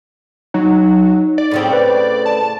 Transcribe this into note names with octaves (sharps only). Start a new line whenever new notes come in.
F#3 D#4
D5
A2 C#3 C4
B4
A5